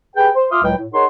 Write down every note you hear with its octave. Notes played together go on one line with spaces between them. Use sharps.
G4 G#4 B4 G5
C5
F4 E5 C6 D6 D#6 F6
C#2 A2 F#3 G#3 B4 G5
A2
D#4 G#4 A#4 C#5 F#5 C6